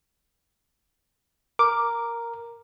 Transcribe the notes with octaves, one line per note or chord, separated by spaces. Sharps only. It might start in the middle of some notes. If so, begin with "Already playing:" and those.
A#4 D6